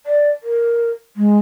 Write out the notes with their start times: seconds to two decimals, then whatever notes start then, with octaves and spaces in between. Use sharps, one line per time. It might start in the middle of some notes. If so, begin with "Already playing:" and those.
0.06 D5
0.43 A#4
1.17 G#3